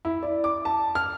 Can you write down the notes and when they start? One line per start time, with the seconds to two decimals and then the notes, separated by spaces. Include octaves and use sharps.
0.05 E4
0.23 D5
0.44 D6
0.65 A5
0.95 F6